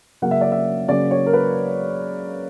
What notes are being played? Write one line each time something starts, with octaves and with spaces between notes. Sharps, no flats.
C#3 F#3 A#3 C#4 F#5
E5
D5
E5
C#3 F#3 A#3 C#4 D5
C#5
A#4
B4